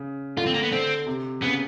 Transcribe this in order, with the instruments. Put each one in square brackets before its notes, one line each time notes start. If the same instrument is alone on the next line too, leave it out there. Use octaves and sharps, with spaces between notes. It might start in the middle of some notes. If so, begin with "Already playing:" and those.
Already playing: [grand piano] C#3
[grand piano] D3 [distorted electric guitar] F4
[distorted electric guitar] C4
A#3
B3
[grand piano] D3 [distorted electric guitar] C4
[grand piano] C3
[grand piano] C#3 [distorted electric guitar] B3